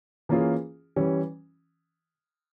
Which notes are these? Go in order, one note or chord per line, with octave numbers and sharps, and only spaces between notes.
E3 A#3 C#4 F4 G#4
E3 G3 C#4